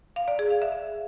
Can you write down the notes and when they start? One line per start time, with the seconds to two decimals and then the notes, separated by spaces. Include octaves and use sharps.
0.16 F5
0.28 D5
0.39 G#4
0.50 F5
0.62 E5